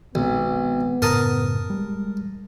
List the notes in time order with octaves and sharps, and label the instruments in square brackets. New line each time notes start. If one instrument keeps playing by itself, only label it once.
[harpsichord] B1 [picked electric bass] D#3 G#3 C4 [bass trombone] B3
[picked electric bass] F#2 A2 C#3 [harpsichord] A#4 A5 D#6
[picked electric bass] G3 G#3